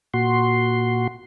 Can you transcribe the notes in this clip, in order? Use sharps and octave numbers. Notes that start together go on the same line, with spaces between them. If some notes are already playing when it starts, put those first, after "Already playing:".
A#2 F#4 C6